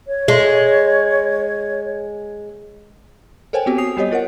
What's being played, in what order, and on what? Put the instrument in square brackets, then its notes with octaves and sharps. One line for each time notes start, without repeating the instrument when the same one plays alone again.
[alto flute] C#5
[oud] G#3
[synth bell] A4 A#4 C5 C#5 G5 G#5
B3 C4 F#4 G4 A4
G#5 D#6 C7 F7
G3 B3 G4 C#5 D#5
F4 A#4 C#5 F#5